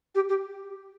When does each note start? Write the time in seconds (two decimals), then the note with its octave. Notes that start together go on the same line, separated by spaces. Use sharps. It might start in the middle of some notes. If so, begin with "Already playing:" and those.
0.15 G4
0.29 G4